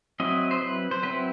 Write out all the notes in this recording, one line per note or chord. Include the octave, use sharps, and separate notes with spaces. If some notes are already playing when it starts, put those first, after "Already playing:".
F#3 C4 E4 D#5
C5
B4
C5
F#3 C4 E4 B4